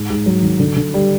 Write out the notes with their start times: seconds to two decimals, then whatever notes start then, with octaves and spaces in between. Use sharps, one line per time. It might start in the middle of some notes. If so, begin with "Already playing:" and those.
Already playing: G#2
0.10 G#2
0.26 F#3
0.43 D#3
0.60 D3
0.76 D3
0.94 G3